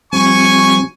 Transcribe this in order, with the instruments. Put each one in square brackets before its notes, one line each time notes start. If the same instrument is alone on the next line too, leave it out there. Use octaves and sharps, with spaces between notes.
[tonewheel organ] F3 G3 C4 [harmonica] G#5 C#6